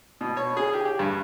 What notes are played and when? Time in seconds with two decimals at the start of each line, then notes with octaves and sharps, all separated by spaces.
0.21 B2
0.37 C#5
0.57 G#4
0.73 G4
0.85 G4
0.99 G2